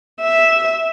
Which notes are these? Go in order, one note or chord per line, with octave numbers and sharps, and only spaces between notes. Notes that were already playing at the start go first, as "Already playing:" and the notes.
E5